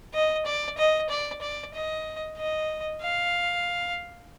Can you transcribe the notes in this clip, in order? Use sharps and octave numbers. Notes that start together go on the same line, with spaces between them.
D#5
D5
D#5
D5
D5
D#5
D#5
F5